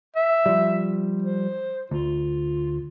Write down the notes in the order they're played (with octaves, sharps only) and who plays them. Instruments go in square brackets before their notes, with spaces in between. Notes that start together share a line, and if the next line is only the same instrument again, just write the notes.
[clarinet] E5
[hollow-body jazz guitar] F3 G3
[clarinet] C5
[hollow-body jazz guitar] D2 [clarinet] F4